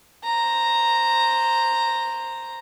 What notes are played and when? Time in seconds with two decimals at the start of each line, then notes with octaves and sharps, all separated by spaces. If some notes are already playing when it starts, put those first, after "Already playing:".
0.23 C5 A#5